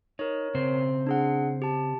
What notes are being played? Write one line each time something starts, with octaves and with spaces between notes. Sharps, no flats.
D#4 A#4 C#5
C#3 C4 C5
D4 G#4 F#5
G4 A5